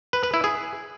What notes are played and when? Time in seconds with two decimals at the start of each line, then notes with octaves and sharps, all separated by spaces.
0.13 B4
0.23 B4
0.34 E4
0.44 G#4